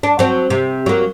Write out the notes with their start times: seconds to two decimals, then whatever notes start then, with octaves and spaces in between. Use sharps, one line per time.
0.03 D4
0.19 F#3 C4
0.50 C3
0.86 F#3 A#3